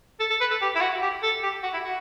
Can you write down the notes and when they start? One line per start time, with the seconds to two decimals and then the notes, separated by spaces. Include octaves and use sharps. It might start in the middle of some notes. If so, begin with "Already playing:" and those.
0.20 A4
0.30 A4
0.40 B4
0.51 A4
0.61 G4
0.75 E4
0.81 F#4
1.02 G4
1.23 A4
1.43 G4
1.63 F#4
1.73 E4
1.84 F#4